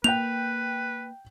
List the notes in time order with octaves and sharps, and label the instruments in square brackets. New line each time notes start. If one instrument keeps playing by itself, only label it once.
[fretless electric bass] A#3 [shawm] B4 [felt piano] G5 F#6 G6 [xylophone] F7